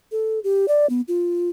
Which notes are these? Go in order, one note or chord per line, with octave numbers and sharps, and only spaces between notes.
A4
G4
D5
B3
F4